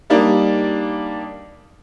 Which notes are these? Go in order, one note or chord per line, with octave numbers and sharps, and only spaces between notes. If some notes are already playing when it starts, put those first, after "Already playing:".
G3 A#3 D4 D#4